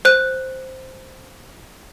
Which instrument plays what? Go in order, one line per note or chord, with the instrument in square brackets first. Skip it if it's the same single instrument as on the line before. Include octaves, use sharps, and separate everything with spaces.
[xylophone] C5 F#6